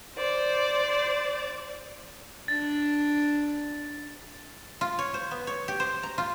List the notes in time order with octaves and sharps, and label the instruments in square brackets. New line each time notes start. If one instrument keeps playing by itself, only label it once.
[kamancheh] C5 D5
[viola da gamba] D4 [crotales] A6
[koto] F4
C#5
C5
B3
C#5
G4
C5
A#5
F4